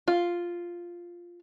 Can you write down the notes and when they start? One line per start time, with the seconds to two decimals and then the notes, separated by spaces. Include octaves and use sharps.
0.08 F4